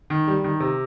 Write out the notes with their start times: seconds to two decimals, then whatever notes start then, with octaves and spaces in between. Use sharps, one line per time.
0.10 D#3
0.27 G3
0.44 D#3
0.60 C3